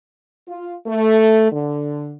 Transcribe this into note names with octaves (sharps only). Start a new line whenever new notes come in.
F4
A3
D3